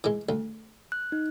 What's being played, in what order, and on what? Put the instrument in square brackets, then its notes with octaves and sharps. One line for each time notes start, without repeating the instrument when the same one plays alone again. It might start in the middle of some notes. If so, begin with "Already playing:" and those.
[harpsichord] E3 G#3
D2
[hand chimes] F#6
D#4